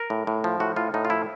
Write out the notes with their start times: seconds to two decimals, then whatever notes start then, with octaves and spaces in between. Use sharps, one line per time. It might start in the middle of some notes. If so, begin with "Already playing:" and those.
Already playing: A#4
0.10 A2
0.27 A2
0.44 F3
0.60 A2 F#4
0.76 A2 F4
0.94 A2 D#4
1.05 F4
1.10 F3 E4